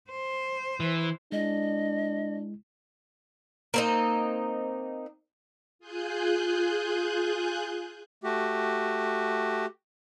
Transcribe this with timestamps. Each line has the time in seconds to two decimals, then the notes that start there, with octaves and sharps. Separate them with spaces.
0.11 C5
0.80 E3
1.32 G#3 D4 E4 D#5
3.74 A#3 C4 D#4
5.79 F4 G#4 G#5 F#6 G6
8.24 A3 F#4 G4